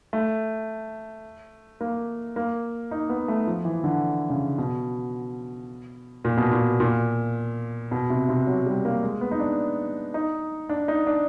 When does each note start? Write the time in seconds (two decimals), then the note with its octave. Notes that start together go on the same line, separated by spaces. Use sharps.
0.13 A3
1.81 A#3
2.36 A#3
2.91 D#4
3.10 B3
3.28 A3
3.47 F3
3.65 E3
3.84 D3
4.30 C#3
4.58 B2
6.25 A#2
6.37 B2
6.51 A#2
6.80 A#2
7.91 B2
8.10 C3
8.29 C3
8.47 F#3
8.66 G3
8.85 A#3
9.03 G#3
9.21 B3
9.31 D#4
9.39 D4
10.14 D#4
10.69 D4
10.88 D#4
11.07 D4